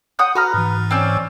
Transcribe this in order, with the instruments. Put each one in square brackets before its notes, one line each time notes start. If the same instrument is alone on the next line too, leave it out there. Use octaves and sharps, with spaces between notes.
[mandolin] F#5 D#6 G6
[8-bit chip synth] F#4 [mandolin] B4 A#5 F6
[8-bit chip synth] G#2 E3
[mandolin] C4 C#4 D5